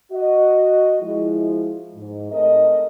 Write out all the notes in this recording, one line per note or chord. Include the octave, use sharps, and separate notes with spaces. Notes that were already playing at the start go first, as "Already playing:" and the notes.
F#4 D#5
F3 G#3 E4
G#2
A3 C4 G#4 A#4 D#5